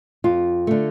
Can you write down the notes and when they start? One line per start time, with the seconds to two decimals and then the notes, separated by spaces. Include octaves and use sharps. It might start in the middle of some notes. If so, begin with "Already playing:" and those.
0.24 F2 F4
0.67 D3 A3